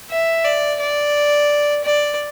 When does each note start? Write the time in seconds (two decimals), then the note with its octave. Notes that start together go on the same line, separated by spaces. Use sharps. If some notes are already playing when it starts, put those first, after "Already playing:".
0.10 E5
0.45 D5
0.80 D5
1.84 D5